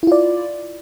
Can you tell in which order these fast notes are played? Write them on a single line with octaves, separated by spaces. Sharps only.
E4 F4 D5